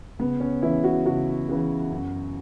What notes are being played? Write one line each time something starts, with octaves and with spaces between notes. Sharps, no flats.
C#2 B3
C#4
C#3 E3 E4
F#4
C#2 F#4
C#3 E3
F#2